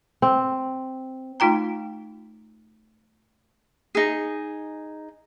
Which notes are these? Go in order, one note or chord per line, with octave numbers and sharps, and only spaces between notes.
C4
A3 D#4 F4 G5 A#5
D#4 G#4